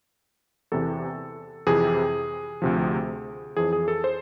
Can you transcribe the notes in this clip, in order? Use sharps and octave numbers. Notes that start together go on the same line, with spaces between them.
E2 C3 E3 A4
F2 C3 E3 G#4
D2 C3 F3
F2 E3 G#4
G#4
A4
C5